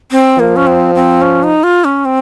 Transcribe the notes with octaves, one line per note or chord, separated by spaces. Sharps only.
C4
F3 A#3
C#4
C4
C4
C#4
D#4
F4
C#4
C4